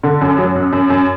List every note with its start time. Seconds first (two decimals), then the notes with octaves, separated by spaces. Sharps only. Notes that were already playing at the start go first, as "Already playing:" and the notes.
0.03 D3
0.21 F#2
0.38 F#3
0.55 F#2
0.73 F#2
0.90 F#2